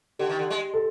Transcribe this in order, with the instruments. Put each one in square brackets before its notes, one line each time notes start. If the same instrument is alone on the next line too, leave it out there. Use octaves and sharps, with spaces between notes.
[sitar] D3 [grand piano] G4
[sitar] D#3
D3
G#3
[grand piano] A4